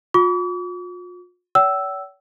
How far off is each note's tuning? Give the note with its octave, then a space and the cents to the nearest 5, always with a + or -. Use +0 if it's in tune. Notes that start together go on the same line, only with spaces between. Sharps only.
F4 +40 D6 -45
C#5 +45 G5 -45 E6 +0